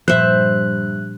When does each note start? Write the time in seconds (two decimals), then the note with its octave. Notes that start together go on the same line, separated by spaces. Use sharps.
0.08 G2 A#2 F3 C5 E5 F#6